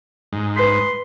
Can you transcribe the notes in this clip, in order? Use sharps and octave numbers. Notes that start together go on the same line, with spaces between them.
G#2
B4 C6 B6